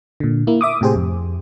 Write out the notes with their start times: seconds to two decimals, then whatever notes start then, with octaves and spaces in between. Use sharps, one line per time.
0.20 A#2 D3
0.47 A#3 E4
0.61 E5 D6 D#6
0.81 A2 C3 G4 G#4 C5
0.96 F2